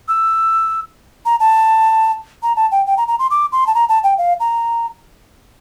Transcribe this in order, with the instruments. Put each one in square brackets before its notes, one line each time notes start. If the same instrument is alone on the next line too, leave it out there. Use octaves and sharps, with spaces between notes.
[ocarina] E6
A#5
A5
A#5
A5
G5
G5
A#5
A#5
C6
D6
C6
A5
A#5
A5
G5
F5
A#5